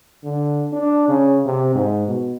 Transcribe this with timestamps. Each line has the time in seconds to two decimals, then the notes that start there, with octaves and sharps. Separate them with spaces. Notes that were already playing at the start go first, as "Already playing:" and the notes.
0.24 D3
0.73 D4
1.08 C#3
1.45 C3
1.75 G#2
2.08 B2